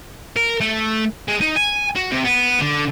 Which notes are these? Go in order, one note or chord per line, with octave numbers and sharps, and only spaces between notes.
A#4
A3
G#3
D#4
G#5
F#4
C3
B3
D3